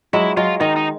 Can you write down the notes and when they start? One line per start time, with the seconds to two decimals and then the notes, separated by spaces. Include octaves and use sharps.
0.13 F#3 G#3 E4
0.37 F#3 G#3 F4
0.61 D#3 D#4
0.76 D#4